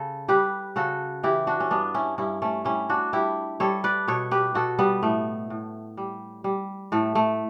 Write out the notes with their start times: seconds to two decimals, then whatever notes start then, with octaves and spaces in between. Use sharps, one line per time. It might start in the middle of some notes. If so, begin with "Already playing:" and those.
Already playing: C#3 A4
0.28 G3 G4 B4
0.76 C#3 F#4 A4
1.23 E3 E4 G4
1.47 D4 F#4
1.60 C#4
1.71 G2 B3 D4
1.95 C#4 E4
2.18 G2 C#4 E4
2.42 A3 C#4
2.65 G3 C#4 E4
2.89 D4 F#4
3.13 G3 E4 G4
3.60 G3 A4 C#5
3.84 B4 D5
4.08 B2 A4 C#5
4.31 G4 B4
4.55 B2 F#4 A4
4.79 G3 B3
5.03 A2 A3
5.50 A2
5.97 G3
6.44 G3
6.92 A2 A3
7.15 A3